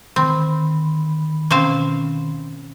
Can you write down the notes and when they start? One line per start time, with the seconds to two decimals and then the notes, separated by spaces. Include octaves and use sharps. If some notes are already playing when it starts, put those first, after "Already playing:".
0.16 D#3 C4 B5
1.51 B2 A#3 C4 C#4 F5